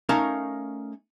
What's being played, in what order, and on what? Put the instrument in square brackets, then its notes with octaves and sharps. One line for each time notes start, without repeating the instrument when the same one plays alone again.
[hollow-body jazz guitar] A3 C#4 D#4 A#4 F5 A5